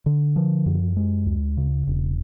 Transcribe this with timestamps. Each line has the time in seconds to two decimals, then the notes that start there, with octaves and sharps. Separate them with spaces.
0.06 D3
0.36 F3
0.66 F#2
0.97 G#3
1.26 D2
1.57 C#3
1.87 E1